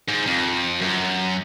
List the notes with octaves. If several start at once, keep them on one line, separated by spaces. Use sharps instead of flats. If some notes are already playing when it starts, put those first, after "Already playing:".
G#2
F2
F#2